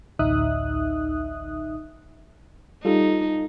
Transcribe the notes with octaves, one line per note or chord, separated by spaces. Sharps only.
A1 D2 D#4 E5 D#6 F#6
G3 D#4 F4 A4